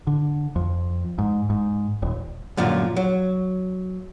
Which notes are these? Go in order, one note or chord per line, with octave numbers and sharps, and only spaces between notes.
D3
F2
G#2
G#2
D#1
F#2 A#2 D3 F3
F#3